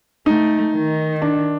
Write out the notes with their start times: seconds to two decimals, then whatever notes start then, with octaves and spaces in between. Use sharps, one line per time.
0.26 A3 D#4
0.74 D#3
1.22 D4